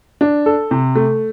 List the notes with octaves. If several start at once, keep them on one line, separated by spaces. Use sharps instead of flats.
D4
A4
C3
A3